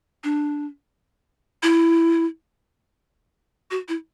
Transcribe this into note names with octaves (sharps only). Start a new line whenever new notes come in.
D4
E4
F#4
E4